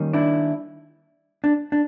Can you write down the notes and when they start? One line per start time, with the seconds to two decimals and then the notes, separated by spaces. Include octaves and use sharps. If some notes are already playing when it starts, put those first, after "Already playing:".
Already playing: D#3 G3 A#3 C#4
0.13 D4 E4
1.44 D4
1.72 D4